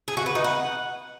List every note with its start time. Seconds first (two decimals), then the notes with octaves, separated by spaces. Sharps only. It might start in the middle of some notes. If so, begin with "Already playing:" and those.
0.08 G#4
0.17 F#4
0.26 B4
0.35 D#4
0.44 F#5